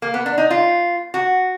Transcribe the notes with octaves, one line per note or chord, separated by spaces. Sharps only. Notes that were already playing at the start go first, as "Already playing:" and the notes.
A#3
B3
D4
D#4
F4
F#4